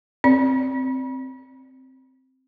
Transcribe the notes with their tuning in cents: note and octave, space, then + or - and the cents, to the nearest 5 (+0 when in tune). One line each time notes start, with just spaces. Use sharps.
C4 +0 D5 +0